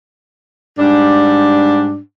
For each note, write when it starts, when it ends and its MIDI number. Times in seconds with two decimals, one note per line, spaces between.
0.79 1.97 44
0.79 1.97 55
0.79 1.97 62